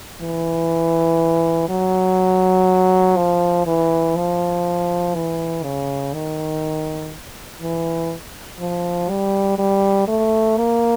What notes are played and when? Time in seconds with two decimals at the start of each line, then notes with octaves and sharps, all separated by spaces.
0.21 E3
1.69 F#3
3.17 F3
3.66 E3
4.16 F3
5.15 E3
5.64 C#3
6.13 D#3
7.61 E3
8.60 F3
9.10 G3
9.59 G3
10.08 A3
10.57 A#3